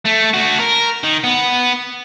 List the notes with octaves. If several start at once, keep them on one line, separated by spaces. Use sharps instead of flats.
A3
A3 F#4
A#4
D#3
B3